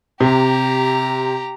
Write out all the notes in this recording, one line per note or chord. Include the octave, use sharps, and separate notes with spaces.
C3 G4 A#5